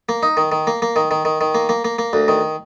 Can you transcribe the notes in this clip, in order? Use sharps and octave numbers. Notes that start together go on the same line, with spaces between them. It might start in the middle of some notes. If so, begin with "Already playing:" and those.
A#3
D#4
D#3
D#3
A#3
A#3
D#3
D#3
D#3
D#3
A#3
A#3
A#3
A#3
D2
D#3